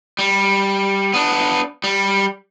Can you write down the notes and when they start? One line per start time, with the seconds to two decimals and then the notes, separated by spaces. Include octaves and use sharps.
0.19 G3
1.14 B3 D4
1.84 G3